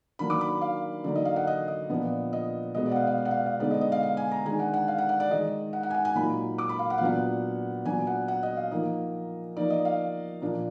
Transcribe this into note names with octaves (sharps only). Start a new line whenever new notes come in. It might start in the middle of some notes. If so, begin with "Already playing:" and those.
D#3 F#3 A#3 D4 B5
D6
B5
F5
D3 F#3 A#3 D#4 D5
D#5
F5
F#5
D#5
D#5
A#2 F3 B3 D4
D#5
B2 G#3 B3 D#5
D5
F#5
F5
F5
D5
F#5
F5
F5
D3 G#3 B3 D#4 D5
D#5
D#5
F5
F5
G#5
A#5
D#3 G#3 D4 G#5
F#5
F#5
F5
F#5
F#5
D5
D#3 G#3 D#4 D#5
F#5
F#5
G#5
F#5
G#5
A#2 F#3 A#3 D#4 B5
D6
B5
F5
F#5
F5
A#2 F#3 B3 D4 F#5
A#2 F#3 B3 D4 G#5
F#5
F#5
D#5
F5
F3 A#3 D#4 D#5
F3 A#3 D#4 D5
D#5
F5
A#2 F3 A#3 D4